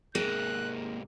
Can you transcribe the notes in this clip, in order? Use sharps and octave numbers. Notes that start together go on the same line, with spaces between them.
G#2 C3 A#3 G#4 F#6